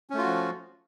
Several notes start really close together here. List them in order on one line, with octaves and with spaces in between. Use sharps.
C#4 A3 F4 F#4 F3